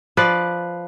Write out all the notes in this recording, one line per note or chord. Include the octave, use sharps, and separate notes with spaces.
F3 B4 D5